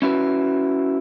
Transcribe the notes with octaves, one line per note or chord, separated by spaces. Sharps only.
C#4 E4 F#4 B4